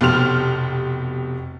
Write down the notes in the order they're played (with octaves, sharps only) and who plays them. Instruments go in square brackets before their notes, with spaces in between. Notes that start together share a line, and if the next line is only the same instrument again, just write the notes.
[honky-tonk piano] F1 B2 G4 C6 F6 F7